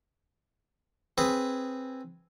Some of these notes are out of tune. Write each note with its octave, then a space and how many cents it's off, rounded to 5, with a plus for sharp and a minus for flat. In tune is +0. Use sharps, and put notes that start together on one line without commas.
C4 +5 G#4 +0 B4 +0